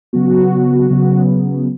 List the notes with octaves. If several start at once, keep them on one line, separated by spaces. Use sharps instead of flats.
C#3 F#3 B3 F#4
C#3 F#3 B3